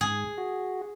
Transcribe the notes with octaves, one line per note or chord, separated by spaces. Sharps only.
G#2 G#4
F#4